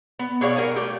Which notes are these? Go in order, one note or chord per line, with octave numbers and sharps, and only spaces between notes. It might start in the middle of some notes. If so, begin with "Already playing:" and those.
B3
B2 F#4 G#4 C#5 D5 F5
G3 A#4 C#5 F#5 G#5
A3 G4